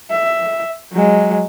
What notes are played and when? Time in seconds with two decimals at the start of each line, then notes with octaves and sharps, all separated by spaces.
0.11 E5
0.92 F#3 G#3